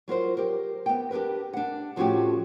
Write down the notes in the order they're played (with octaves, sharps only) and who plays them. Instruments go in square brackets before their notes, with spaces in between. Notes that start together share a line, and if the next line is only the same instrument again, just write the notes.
[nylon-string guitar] F#3 F4 A#4 C5
G4 A#4
B3 G5
D4 G4 G#4 A#4 B4
D4 F#5
A2 F3 A3 C#4 F#4 G4